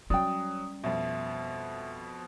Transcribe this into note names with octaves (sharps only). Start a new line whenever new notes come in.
F#3 G3 C#4 D5 G5 D#6
F2 B2 E5